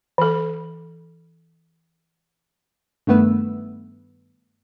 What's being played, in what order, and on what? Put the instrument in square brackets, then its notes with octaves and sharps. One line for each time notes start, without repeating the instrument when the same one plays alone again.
[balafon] E3 A4
[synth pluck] G2 D#3 A3 B3 B4 E6